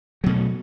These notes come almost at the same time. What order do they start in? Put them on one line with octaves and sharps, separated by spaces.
F#3 B2 A3